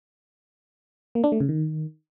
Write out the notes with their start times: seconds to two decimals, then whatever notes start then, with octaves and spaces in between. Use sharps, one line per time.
1.15 A#3
1.24 D4
1.32 A3
1.40 C#3
1.49 D#3